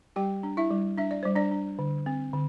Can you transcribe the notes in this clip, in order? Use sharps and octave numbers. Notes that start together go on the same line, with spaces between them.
G3 G4 G5
D4
E4 E5
G3
D4 E5
D5
G3 C5
D4 D5
D4
D3
C4
D3